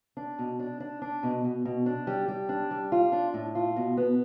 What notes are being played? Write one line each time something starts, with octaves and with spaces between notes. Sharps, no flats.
D4
B2
D4
D4
D4
B2
B2
B2
D4
G3
G3
D4
G3
F4
D4
A2
F4
B2
B3